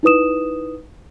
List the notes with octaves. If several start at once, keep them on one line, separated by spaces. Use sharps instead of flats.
D#4 E4 B4 D#6 E7